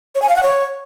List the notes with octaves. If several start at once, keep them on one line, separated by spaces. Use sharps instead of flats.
C#5
G#5
F5
F#5
C#5